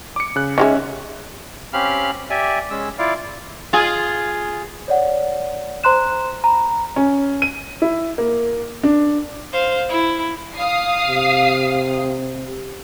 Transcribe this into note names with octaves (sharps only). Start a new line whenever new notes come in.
D6 C#7
C#3 F#6
D#3 G3 G#3 C#4 E5
C4 C#4 G4 F5 B5 F6
G4 D5 E5 G#5
G#3 C#4 E6
E4 F4 D5 F5
F4 G#4
C#5 D5 F#5
C5 A#5 C6 F#6 E7
A#5 B5
C#4
D#7
E4
A#3
D4
C5 F5
E4
F5 D#6 C7
C3